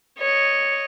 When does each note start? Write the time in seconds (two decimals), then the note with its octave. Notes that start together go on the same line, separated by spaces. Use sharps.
0.19 C#5 D#5